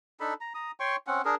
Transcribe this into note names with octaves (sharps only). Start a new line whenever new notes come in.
D4 D#4 A4 B5
A#5
A#5 D#6
C#5 G5 C6 C#6
C4 C#4 F#5
D4 G#4 A#4